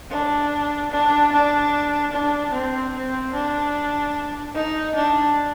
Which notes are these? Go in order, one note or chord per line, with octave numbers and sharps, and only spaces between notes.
D4
D4
D4
D4
C4
C4
D4
D#4
D4